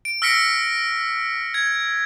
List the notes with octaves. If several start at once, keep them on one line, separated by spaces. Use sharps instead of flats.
D7
E6 F6 A#6 B6 C#7 D7
G#6